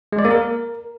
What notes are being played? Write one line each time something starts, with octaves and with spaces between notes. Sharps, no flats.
G#3
D5
A#3
A#4